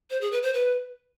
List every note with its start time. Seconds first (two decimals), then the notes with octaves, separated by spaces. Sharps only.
0.10 C5
0.21 G#4
0.32 B4
0.43 C5
0.54 B4